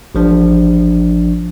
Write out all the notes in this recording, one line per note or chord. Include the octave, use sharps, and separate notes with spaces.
A1 F3 D4